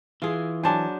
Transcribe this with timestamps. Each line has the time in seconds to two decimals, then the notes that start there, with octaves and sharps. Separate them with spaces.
0.22 E3 F4 G#4
0.63 F#3 D4 C5 G#5 A5